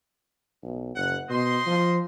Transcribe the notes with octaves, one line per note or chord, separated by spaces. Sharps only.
B1
F#1 F#5
B2 C5 D#5 C6
F3